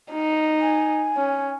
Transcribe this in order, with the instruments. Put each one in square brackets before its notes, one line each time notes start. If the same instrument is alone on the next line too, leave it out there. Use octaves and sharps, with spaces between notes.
[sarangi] D#4
[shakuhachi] G#5
[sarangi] C#4